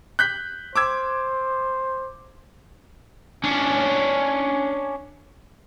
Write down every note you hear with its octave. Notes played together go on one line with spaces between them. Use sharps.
F#6 G6 B6
C5 D6 E6 G#6
C#4 D4